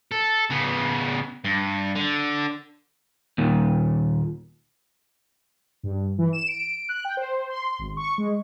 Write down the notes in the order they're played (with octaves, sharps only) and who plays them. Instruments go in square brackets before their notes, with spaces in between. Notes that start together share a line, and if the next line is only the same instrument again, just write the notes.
[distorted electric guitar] A4
C#3 B3
G2
D3
[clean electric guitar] D#2 A#2
[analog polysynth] G2
E3
E7
D7
F#6
G5
C5
C6
G#1
C#6
G#3